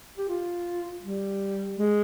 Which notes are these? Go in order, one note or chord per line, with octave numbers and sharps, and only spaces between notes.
G4
F4
G3
G#3